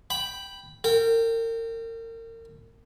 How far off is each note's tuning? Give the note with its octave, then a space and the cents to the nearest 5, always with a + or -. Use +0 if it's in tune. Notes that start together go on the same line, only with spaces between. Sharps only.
G5 +0 B5 +0
A#4 -35 G5 +0